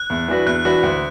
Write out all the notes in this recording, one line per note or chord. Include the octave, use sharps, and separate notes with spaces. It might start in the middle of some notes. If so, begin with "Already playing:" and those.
Already playing: F#6
E2
E3 D4 F#4 B4
E2 F#6
E3 D4 F#4 B4
D2